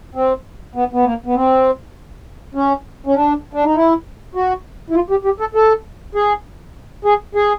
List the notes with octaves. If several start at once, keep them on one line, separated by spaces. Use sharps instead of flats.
C4
B3
B3
A#3
B3
C4
C#4
C#4
D4
D4
D#4
E4
F#4
E4
F4
G4
G4
A4
A4
G#4
G#4
G#4